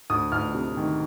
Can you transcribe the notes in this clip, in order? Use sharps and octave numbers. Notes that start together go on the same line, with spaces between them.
D2 D#6
D2 F6
C3
D#3